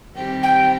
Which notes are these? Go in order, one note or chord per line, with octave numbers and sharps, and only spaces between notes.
D#3 G3 C4 G4
G5